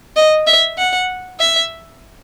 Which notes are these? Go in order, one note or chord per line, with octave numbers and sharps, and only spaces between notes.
D#5
E5
F#5
E5